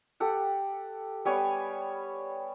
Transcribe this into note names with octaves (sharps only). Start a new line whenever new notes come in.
G4 A4 F#5
G3 B3 C#5 G#5